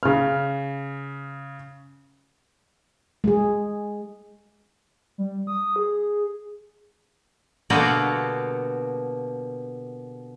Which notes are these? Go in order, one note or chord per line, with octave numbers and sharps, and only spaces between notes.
C#3 F6
G#3 G#4
G3
D#6
G#4
B2 D3 G3 A#3 B3 F#4